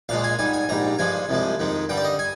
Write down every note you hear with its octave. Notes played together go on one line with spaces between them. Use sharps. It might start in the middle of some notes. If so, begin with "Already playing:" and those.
A#1 A#2 F3 G#3 F5
G#5
G#2 G3 G#5
G#5
A#1 G#2 G3 A#5
G2 F3 G#3 G#5
C2 C3 F3 G#3
F2 D#3 G#3
G2 D3 G3 G5
D5
D#5
G#5